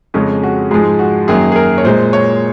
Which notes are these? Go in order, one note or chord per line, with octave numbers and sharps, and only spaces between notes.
F2 C#3 G#3 C#4
F#4
G#2 F3 G#3 G#4
F#4
F#2 D#3 F#3 A#3 G#4
G#4
A#4
C#5
A#2 G#3 C5
C#5